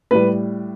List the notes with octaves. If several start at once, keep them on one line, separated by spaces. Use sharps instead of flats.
A2 G3 B4